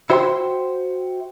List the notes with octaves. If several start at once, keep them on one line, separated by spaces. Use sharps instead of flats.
E4 F#4 C5 E5 G5 C6